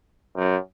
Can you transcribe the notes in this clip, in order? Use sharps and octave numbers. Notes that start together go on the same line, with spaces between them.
F#2